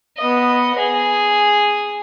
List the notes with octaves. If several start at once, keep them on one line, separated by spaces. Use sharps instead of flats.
B3 D#5
G#4